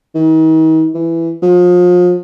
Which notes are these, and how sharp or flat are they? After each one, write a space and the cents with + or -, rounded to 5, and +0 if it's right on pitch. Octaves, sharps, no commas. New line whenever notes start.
D#3 +40
E3 +10
F3 +35